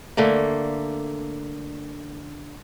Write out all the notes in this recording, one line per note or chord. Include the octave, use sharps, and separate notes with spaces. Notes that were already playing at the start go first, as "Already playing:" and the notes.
D3 A3 A#3